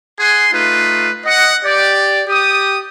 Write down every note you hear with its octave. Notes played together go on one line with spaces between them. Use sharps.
G#4 F#5 G#5 C6
A3 D#4 F4 B4
D#5 F#5
G4 D5
G4 D#6